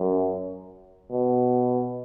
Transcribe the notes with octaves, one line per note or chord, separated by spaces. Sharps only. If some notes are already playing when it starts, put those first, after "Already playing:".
Already playing: F#2
B2